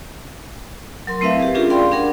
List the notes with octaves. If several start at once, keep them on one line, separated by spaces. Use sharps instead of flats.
F#3 A#4 C6
A3 C4 E4 B4 E5 F5
G4 G#4
C#4 D4 F4 G4 G#4 A#4
D5 F5 G5 B5 C6
D4 G#4 A#4 F#5